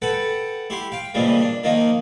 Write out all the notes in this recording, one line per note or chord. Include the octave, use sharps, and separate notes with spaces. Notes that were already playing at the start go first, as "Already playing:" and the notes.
A4 B4 F#5 G5
E4 G4 C6
F5 G5
A#2 C#3 E3 F3 G3 G#3
D4
D#3 F3 A#3 D#4